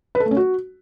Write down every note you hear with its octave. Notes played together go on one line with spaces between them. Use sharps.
B4
A4
A3
C#4
F#4